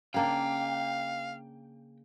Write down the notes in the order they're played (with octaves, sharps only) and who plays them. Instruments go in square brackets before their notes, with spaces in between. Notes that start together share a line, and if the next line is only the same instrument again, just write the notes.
[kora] C#3 A#3 D4 [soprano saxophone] F5 [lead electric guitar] G5